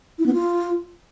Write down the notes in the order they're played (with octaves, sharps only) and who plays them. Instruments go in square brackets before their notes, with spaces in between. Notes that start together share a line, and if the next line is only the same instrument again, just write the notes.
[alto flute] E4
B3
F4